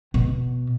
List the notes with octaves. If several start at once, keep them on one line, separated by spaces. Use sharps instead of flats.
B2